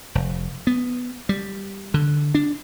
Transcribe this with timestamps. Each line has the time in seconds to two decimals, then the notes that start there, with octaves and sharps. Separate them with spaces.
0.15 F1
0.67 B3
1.29 G3
1.94 D3
2.35 D4